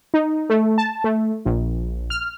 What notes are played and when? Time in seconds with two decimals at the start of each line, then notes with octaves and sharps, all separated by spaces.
0.14 D#4
0.50 A3
0.78 A5
1.04 A3
1.45 A#1
2.10 F6